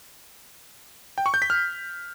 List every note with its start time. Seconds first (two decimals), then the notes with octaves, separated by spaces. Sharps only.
1.18 G5
1.26 C#6
1.34 G6
1.42 B6
1.50 F6